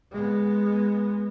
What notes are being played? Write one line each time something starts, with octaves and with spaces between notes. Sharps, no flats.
G#3 B3